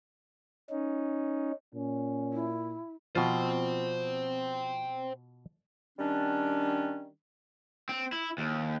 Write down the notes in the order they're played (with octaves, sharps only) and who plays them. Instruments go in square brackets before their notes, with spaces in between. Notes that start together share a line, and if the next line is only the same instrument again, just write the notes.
[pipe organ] C#4 D#4
[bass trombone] A#2 [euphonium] C#4
[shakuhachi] E4
[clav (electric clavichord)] B2 F4 [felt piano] F3 [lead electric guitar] C5 G5
[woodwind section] D#3 G3 C#4 D4
[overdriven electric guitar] C4
E4
D#2